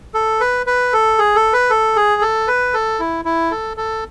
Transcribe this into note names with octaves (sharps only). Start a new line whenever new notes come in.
A4
B4
B4
A4
G#4
A4
B4
A4
G#4
A4
B4
A4
E4
E4
A4
A4